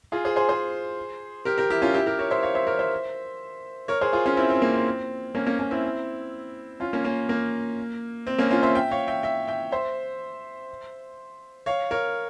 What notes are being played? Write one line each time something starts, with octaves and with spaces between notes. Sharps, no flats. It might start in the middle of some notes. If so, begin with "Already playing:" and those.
F4 G#4
G#4 C5
G#4 C5
G#4 C5
G4 A#4
G4 A#4
E4 G4
C#4 F4
E4 G4
G4 A#4
A#4 C#5
C5 E5
C#5 F5
C5 E5
A#4 C#5
C5 E5
A#4 C#5
G#4 C5
F4 G#4
C#4 F4
C4 E4
C4
A#3
C4
A#3 C#4
A#3 C#4
A#3 C#4
C4 E4
C#4 F4
A#3 C#4
A#3 C#4
A#3
C4
A#3 C#4
C#4 F4
C5 E5
E5 G5
C#5 F5
E5 G5
E5 G5
E5 G5
C5 E5
C#5 F5
A#4 C#5